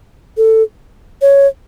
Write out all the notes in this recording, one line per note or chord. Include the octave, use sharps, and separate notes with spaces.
A4
C#5